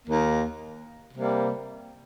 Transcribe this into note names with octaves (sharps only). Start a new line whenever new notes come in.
D#2 D#3 A#3
C3 G3 A#3